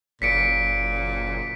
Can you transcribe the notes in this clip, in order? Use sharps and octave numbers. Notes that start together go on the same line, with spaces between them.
F#1 A#2 B6 C#7 D7